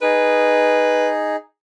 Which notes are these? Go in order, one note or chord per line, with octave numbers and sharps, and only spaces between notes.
D#4 G#4 B4